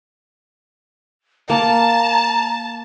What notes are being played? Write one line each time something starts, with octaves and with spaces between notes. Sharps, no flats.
A#3 A5 A#5